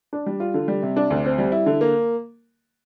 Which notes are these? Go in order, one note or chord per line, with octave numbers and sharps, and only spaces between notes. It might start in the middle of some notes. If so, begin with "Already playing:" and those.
D4
G3
F4
D3
G3
C3
D4
D2
C4
G3
E4
D3
A#3